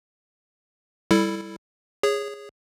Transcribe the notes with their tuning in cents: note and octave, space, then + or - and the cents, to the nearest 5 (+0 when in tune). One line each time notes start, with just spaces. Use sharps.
G3 +0 E4 +0 A4 +0
G#4 -15 C#5 +0